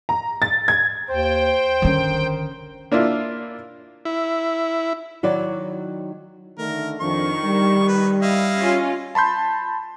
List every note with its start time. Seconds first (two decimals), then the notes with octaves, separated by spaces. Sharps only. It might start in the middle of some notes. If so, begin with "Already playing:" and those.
0.09 A#5
0.42 A6
0.68 G#6
1.09 D#2 C5 G5
1.82 D3 D#3 C#4
2.92 A#3 D4 E4 F4
4.05 E4
5.23 D#3 F#3 E4 F#4 D5
6.59 D3 D#3 A3 A#4
7.01 F2 D#3 F3 D4 C#6
7.45 G3
7.88 B4
8.22 E4 D#5 F5
8.57 C#4 F4
9.15 A5 B5 C6 G6